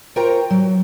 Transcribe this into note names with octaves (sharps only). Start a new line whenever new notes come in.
F4 A#4 C5 C#5 G5 A#5
F#3